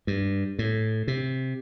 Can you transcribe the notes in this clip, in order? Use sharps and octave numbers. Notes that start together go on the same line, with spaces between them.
G2
A2
C3